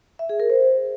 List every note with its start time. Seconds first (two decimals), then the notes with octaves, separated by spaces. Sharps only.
0.19 E5
0.29 G#4
0.40 A#4
0.50 C5